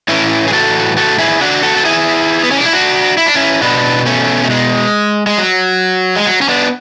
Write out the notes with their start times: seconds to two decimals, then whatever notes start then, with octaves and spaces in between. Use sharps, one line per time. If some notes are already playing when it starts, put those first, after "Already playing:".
0.08 A2 E3 C#4 E4
0.48 G#4
0.53 F#4 A4
0.97 F#4 A4
1.19 E4 G#4
1.41 D4 F#4
1.63 F#4 A4
1.76 A4
1.85 E4 G#4
2.43 B3
2.51 C#4
2.58 D4
2.66 E4
2.73 D4 F#4
3.17 E4
3.26 D4
3.35 C#4 E4
3.61 B2 B3 D4
4.06 A3 C#4
4.45 A3
4.50 G#3
5.27 G#3
5.38 F#3
6.16 G#3
6.27 F#3
6.42 C#4
6.48 B3 D4